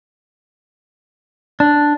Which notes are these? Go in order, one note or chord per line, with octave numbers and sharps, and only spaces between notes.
D4